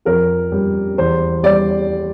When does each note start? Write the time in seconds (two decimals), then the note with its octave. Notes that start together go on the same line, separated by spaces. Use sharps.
0.05 F2 A#4
0.52 G3
0.98 E2 C5
1.43 G3 D5